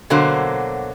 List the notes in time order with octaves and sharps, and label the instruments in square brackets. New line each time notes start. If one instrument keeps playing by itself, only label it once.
[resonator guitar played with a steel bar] B2 D3 F#3 A#3 F#4 C5